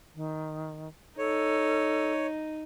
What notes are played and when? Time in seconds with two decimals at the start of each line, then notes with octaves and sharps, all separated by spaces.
0.15 D#3
1.18 D#4 A4 C#5